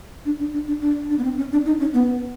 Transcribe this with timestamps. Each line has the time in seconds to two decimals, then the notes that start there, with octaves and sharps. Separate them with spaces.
0.25 D4
0.40 D4
0.53 D4
0.68 D4
0.81 D4
1.10 D4
1.19 B3
1.24 C4
1.38 C#4
1.52 D4
1.66 D#4
1.80 C#4
1.94 B3